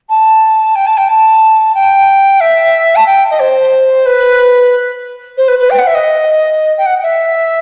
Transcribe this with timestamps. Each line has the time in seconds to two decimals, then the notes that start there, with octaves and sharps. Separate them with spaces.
0.09 A5
0.75 G5
0.86 A5
0.97 G5
1.09 A5
1.74 G5
2.40 E5
2.95 A5
3.06 G5
3.30 D#5
3.39 C5
4.06 B4
5.37 C5
5.48 B4
5.59 B4
5.70 G5
5.78 F#5
5.87 E5
5.95 D#5
6.77 G5
6.86 F#5
7.02 E5